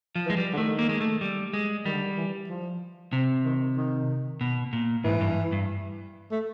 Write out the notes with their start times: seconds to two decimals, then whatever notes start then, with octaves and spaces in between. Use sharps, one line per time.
0.16 F3
0.26 E3 G#3
0.37 G3
0.53 D3
0.58 D#3 A3
0.79 A#3
0.89 G#3
1.01 A3
1.21 G3
1.53 G#3
1.85 D#3 G3
1.93 D3
2.02 D#3
2.17 E3
2.49 F3
3.13 C3
3.45 D#3
3.76 D#3
4.41 B2
4.73 A#2
5.04 G#2 E3
5.21 G2
5.52 G2
6.32 A3